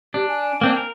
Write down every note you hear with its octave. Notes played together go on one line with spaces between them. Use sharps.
D4 G4
G#5
A#3 C4 D4
A#4